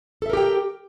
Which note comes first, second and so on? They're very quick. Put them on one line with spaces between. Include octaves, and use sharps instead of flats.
A4 E5 A#4 G4 G5